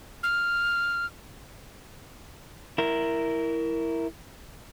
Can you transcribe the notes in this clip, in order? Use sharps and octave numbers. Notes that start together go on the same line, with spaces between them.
F6
E4 A#4